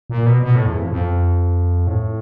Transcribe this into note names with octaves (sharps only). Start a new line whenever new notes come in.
A#2
B2
B2
A2
E2
F2
F2
A2